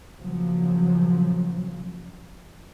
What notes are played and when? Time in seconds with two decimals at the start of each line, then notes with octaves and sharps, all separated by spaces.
0.17 A#2 C#3 F3 F#3